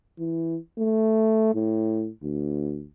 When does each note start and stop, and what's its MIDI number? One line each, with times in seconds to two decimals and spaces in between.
0.19 0.57 52
0.78 1.54 57
1.55 2.08 45
2.23 2.85 38